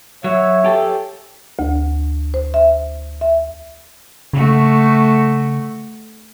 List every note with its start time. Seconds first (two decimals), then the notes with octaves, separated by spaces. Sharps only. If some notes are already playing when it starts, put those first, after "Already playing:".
0.24 F#3 C#5 E5
0.64 G4 A4
1.59 D2
2.34 C5
2.54 E5
3.21 E5
4.33 C#3 A3 F#4